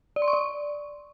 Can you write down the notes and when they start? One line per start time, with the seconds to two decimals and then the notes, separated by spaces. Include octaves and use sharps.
0.16 D5
0.22 C6
0.28 C#6
0.33 D5